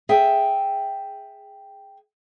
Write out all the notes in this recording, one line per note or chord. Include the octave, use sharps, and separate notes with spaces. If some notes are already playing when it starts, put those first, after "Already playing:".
G#4 E5 G5